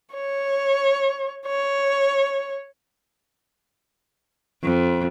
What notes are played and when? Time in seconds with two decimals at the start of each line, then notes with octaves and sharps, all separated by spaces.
0.15 C#5
1.47 C#5
4.63 F2